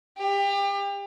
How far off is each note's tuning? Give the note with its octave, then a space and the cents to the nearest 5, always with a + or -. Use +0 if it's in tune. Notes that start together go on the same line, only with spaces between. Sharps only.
G4 +30